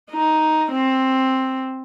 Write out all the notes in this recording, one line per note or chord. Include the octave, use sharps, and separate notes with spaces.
D#4
C4